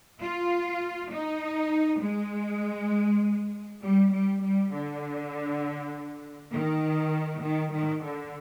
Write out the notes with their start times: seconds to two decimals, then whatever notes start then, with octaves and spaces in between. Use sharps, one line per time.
0.21 F4
1.12 D#4
2.02 G#3
3.83 G3
4.13 G3
4.43 G3
4.73 D3
6.54 D#3
7.43 D#3
7.73 D#3
8.03 D3